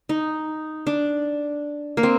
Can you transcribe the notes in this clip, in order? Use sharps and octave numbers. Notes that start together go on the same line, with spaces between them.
D#4
D4
A#3
C4